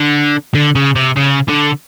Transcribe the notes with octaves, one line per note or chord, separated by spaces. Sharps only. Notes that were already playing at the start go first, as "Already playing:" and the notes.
Already playing: D3
D3
C#3
C3
C#3
D3